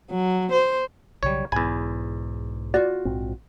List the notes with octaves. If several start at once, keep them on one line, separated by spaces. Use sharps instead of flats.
F#3
C5
B1 C#3 F#3 G3 C#5
B1 E2 G#2 G#5 B5
F4 F#4 D5
A#1 G#2 C4